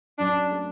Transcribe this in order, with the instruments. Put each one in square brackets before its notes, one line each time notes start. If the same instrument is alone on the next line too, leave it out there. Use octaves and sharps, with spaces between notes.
[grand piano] F#2 [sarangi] D4
[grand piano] A3